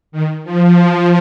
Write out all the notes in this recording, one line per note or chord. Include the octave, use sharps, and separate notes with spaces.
D#3
F3